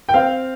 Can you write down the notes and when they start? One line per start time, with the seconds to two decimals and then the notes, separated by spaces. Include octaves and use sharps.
0.09 G5
0.14 C4 F5